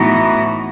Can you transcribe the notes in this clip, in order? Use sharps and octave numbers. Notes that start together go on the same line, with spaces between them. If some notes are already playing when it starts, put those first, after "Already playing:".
Already playing: A2 E3 B3 D#4 F#4